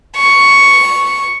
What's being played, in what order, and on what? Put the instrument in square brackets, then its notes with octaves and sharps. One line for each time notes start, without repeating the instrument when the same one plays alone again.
[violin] C#6